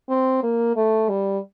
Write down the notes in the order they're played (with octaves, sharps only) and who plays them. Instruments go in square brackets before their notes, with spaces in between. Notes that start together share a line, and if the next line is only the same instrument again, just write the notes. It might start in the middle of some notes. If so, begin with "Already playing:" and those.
[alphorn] C4
A#3
A3
G3